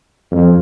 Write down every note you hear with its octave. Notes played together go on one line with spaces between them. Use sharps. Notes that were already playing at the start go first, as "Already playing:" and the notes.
F2